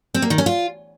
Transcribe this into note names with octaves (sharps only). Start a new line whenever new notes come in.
C4
A#3
D#3
C#4
F4